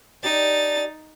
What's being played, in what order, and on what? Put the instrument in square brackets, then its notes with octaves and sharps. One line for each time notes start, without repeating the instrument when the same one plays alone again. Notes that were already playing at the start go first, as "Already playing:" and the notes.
[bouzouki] D4 G4 [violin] D#4 A6